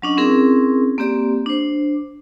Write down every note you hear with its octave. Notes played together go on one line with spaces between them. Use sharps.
F#3 C#4 D4 D#5
C4 C#4 E4 G#4 A#4
A#3 C4 G4 D5
D4 C5